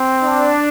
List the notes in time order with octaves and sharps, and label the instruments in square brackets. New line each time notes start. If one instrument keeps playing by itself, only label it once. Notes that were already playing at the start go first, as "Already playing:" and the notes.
Already playing: [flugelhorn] C4
[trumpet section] D4